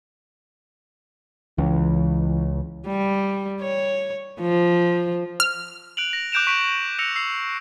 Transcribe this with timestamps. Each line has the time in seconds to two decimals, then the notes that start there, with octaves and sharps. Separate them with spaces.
1.58 C#2 E3
2.87 G3
3.61 C#5
4.40 F3
5.40 F6
5.97 F#6 D7 F7 F#7
6.13 A#6
6.32 D6 F#6 G6 D7 E7 F7
6.47 C#6 B6 D7 E7
6.99 E6 F#6 A#6 C#7 F7
7.15 E6 C7